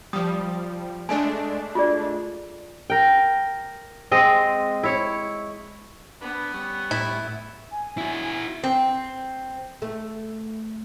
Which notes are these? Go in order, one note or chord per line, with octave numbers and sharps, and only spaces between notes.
F3 G3 D#6
G#3 A3 D4 G#5
F4 G#4 D5
A#4 G5
G#3 C4 D#5
E4 C#5
B3 D4 B4
G3 C#4
A2 E4
G#5
E4 F#4
C4
A3